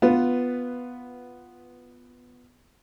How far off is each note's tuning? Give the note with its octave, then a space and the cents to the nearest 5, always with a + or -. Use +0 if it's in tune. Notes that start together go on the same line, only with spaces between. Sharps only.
B3 +0 F4 +0 B4 +5